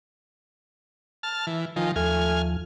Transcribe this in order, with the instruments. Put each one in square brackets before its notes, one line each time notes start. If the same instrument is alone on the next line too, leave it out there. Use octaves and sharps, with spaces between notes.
[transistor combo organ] A5 F6
E3
[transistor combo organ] D#3 F3 [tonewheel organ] G#5
[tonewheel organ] D#2 F3 [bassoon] A3 [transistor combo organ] G#5 F6